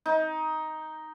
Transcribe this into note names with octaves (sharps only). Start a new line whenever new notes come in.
D#4